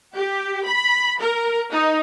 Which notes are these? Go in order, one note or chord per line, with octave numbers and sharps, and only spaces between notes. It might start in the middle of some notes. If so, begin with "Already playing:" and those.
G4
B5
A#4
D#4